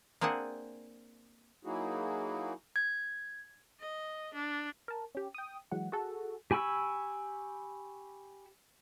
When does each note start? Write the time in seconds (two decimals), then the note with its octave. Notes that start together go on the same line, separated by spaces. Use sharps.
0.21 A#3 C4 D4 G#4 F#5
1.65 F#3 A#3 D#4 E4 F#4 G#4
2.76 G#6
3.80 D#5
4.33 D4
4.88 A#4 A5
5.15 C#4 G4
5.34 G5 D#6
5.71 E3 F#3 G#3 F#5
5.92 F#4 G#4 A4
6.51 G4 G#5 B5 C#6 E6